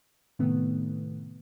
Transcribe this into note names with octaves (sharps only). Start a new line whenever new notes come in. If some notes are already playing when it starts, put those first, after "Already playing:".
A2 C3 D#3 A3 B3